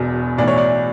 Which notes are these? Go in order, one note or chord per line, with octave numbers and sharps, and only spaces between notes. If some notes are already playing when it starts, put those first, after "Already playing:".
Already playing: E1 E2 B2
B1 A2 E3 D5
C#5
D5